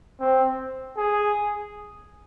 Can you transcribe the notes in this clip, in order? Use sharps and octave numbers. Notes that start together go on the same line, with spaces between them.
C4
G#4